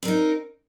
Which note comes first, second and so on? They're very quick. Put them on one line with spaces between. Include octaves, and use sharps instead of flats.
C4 A#4 D#4